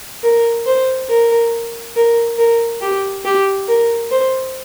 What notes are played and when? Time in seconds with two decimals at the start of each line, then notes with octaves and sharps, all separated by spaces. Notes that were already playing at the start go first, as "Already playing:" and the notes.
0.23 A#4
0.66 C5
1.09 A#4
1.96 A#4
2.38 A#4
2.81 G4
3.25 G4
3.68 A#4
4.11 C5